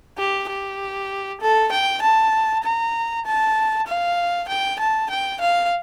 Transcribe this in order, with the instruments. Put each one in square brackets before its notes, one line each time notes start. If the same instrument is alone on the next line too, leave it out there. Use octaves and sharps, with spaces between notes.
[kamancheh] G4
G4
A4
G5
A5
A#5
A5
F5
G5
A5
G5
F5